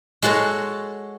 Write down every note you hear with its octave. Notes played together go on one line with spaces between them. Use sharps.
G#3 F#4 A4 C#5